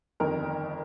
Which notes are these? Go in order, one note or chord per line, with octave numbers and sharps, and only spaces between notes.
G1 F2 D#3 A#4